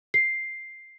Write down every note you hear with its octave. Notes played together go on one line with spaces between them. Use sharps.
C7